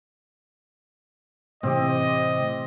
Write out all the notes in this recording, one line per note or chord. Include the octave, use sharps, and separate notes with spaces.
A2 C3 E3 C4 G4 D#5